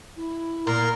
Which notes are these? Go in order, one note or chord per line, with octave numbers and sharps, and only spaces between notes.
E4
A#2 A#4 A#5 C6